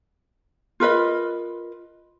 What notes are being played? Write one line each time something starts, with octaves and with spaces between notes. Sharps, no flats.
F4 A#4 B4 D#5